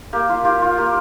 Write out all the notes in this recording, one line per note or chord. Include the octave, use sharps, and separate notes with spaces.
A#3 G4
F4
F4 G4
F4
A#3 G4